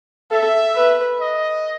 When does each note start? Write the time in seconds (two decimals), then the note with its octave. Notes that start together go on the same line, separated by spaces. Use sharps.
0.31 A4 E5
0.76 B4
1.20 D#5